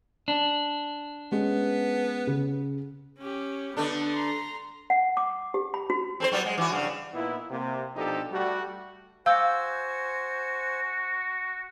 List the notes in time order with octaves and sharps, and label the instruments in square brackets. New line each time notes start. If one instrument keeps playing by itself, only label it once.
[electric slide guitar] D4
[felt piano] G#3 C#4 [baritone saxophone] B3
[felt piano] C#3
[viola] C#4 G4
[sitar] D3 A3 D4 [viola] B3
[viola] A#5 C6
[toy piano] F#5
D6
G4
B5
F#4
[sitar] C4 A4 C5
F#3 G3 B3
G#3
E3 F#4
G2 C#3
[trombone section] A#2 B3 D#4 E4
C3 A#3
B2 F3 D4 D#4 G4 A4
G3 A3 F#4
[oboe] F#4 [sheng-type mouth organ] C5 G#5 [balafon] F5 [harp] D6 E6 G6